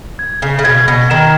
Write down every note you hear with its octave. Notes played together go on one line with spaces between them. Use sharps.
G#6
C#3
C#3
B2 G#6
B2
D#3 E7